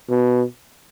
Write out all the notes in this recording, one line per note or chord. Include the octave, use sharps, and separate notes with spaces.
B2